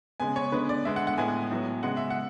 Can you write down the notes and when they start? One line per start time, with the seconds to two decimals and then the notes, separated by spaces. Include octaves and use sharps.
0.20 C#3 G#3 B3 G#5
0.36 C#5
0.52 D3 G#3 B3 B4
0.69 D5
0.85 D3 G#3 B3 E5
0.96 F#5
1.07 F#5
1.18 A2 G#3 B3 G#5
1.51 A2 F#3 B3
1.83 C#3 G#3 B3 F#5
1.97 E5
2.10 F#5